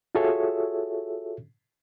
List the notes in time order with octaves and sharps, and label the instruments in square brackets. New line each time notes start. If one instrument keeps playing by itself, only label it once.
[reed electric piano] F4 F#4 G#4 A4 C#5 E5